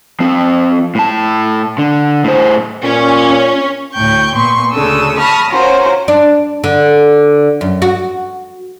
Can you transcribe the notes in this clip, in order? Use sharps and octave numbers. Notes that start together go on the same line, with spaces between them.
F3 C4
A2 A5
D3
A2 C5
A#2 C#4
D2 A2 G5 C#6 G6
A#2 B3 C6 C#6
D2 C#3 D4 A4 D#6 E6
A5 B5 C#6 D#6 F6 A#6
C#4 F4 F#4 A#4 C5 C#5
D4
D3
F#2
F#4